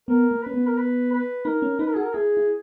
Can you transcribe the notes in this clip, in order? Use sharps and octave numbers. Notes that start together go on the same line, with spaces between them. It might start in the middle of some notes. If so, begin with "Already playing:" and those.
B3 A#4
A#3
C#4 B4
B3
A#4
B4
B4
D#4 A#4
C#4
D#4 B4
A#4
F#4 G#4
A#4
E4 G#4
E4